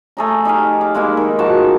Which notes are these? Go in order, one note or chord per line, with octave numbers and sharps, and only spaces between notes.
A3 G#4 A#5
D#4 G4 G#4 F5
D6
G#3 A#3 D#4 E4
D#3
D#3 F3 F#4 A5